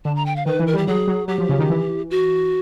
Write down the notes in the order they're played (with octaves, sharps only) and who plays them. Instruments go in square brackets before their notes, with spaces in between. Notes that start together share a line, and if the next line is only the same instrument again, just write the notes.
[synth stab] D3 [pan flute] A5
[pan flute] A#5
G5
F5
[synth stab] D#3 [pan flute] B4
[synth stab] E3
[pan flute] A#4
[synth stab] G3 [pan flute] G4
[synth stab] F#3 [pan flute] G#4
[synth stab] F#3
[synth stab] F#3 [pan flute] G4
[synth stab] F3
C#3
D#3
E3
[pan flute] F#4